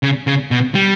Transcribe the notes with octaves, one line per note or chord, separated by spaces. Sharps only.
C#3
C#3
B2
G3